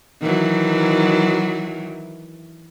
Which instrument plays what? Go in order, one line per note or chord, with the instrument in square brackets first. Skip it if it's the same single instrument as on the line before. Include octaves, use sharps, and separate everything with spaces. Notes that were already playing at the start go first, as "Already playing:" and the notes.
[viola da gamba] D#3 E3 F#3